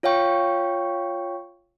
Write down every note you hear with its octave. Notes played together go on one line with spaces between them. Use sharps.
F4 C#5 F5 G5 C#6